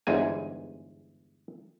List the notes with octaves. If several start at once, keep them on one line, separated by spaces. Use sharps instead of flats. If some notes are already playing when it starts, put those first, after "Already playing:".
G1 E2 G#2 G#5